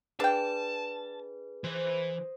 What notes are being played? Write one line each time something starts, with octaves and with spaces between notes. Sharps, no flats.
D4 G#4 B4 G5 A5
E3 C5 D#5